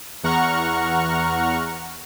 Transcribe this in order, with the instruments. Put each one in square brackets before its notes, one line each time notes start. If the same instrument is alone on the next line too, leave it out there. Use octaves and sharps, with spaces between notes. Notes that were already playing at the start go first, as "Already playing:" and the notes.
[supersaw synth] E2 F#5 A#5 C#6 F6